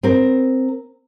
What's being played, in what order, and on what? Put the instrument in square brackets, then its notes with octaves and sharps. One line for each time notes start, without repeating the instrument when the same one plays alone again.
[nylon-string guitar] C4 A#4